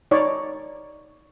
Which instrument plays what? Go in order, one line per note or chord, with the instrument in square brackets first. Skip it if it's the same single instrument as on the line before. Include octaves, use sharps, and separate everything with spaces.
[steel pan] D#4 C#5 D5